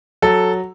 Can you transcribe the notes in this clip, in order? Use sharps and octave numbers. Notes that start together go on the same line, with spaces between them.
F#3 A4